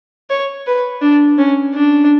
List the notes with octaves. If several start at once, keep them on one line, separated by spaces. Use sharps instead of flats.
C#5
B4
D4
C#4
D4